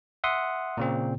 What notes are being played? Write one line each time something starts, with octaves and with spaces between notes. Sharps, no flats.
E5 F#5 C6 D#6
A#2 C#3 C4